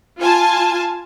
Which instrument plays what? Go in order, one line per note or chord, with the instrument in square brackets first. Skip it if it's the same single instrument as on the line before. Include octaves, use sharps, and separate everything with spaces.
[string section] F4 G#5 A5